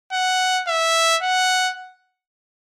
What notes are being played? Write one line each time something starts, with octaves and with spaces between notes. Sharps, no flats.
F#5
E5
F#5